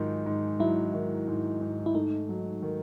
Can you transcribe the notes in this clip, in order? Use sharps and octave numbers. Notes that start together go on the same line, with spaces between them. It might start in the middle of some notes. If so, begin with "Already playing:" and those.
Already playing: G#2 D#3 F#3 F4
G#2
F#3 E4
D#3
G#2
G#2
E4
A3 D#4
F#3
D#3